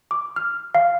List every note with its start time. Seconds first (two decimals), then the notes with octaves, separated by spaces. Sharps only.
0.11 D6
0.36 F6
0.75 F5